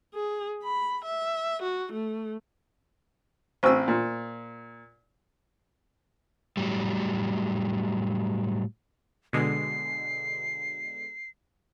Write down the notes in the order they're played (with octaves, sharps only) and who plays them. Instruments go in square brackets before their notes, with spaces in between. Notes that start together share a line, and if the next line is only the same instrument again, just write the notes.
[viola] G#4
B5
E5
F#4
A3
[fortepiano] A1 C4 E6 [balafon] C5 C#6
[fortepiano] A#2
[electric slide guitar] A2 F#3 G3
[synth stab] B2 D3 G#3 [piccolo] C7